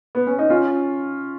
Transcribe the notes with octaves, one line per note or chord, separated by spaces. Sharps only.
B3
C#4
D#4
C#4 F4